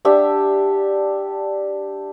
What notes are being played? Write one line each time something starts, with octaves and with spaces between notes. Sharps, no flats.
D4 G4 E5 F#5